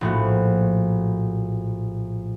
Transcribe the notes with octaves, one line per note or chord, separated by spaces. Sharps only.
A#1 A2 F#4